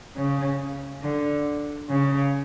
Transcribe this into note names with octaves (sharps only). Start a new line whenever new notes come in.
C#3
D3
C#3